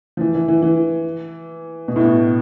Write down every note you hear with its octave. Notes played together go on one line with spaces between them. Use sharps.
F3
E3
E3
E3
E3
B2
A2
B2